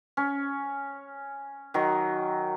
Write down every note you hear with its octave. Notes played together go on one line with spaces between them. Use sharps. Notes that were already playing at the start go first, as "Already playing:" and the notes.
C#4
D#3 F#3